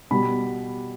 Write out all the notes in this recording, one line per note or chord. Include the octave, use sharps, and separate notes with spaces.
B2 G3 B5